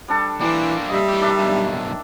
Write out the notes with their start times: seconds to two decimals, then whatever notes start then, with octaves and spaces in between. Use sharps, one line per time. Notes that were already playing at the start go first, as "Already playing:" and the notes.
0.08 G3 D4 A4
0.40 E3 A#3 D4 D5 G5 C6
0.89 G3 D#5 E5
1.08 E3 G4
1.21 D#3 D4 E5
1.39 B1 G2